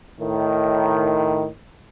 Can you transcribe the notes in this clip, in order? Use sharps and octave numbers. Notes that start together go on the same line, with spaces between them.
A2 D#3